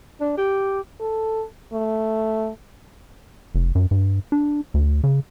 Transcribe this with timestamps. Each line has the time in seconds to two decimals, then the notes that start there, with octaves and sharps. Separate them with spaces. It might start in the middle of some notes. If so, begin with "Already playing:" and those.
0.21 D4
0.37 G4
1.00 A4
1.73 A3
3.55 F1
3.75 F#2
3.91 G2
4.32 D4
4.74 D2
5.04 C#3